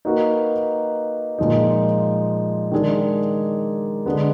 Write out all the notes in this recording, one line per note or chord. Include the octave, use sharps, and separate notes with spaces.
A#3 D#4 F#4 B4
A#2 F3 G#3 D#4
D#3 G#3 D4 G#4
D3 G#3 B3